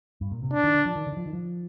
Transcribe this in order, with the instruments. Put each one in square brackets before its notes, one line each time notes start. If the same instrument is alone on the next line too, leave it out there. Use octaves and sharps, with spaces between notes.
[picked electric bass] G2
A#2
C3
[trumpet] D4
[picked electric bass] D#3
D3
F3
D#3
D3
D#3
F3
D#3
F3